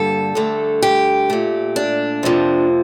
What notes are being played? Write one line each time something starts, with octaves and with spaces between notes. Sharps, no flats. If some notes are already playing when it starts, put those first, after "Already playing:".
Already playing: G2 D3 G3 A#3 A4
G2 D3 A3
G4
A#2 A3
D4
F2 C3 F3 A#3